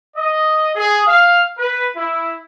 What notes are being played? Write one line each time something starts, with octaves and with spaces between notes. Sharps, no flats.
D#5
G#4
F5
B4
E4